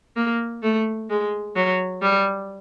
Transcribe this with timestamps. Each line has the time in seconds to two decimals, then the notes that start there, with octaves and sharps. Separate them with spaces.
0.16 A#3
0.62 A3
1.10 G#3
1.56 F#3
2.02 G3